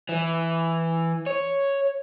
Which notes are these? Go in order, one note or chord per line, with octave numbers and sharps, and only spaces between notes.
E3
C#5